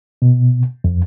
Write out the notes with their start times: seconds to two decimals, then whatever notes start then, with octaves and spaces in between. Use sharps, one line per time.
0.22 B2
0.84 F2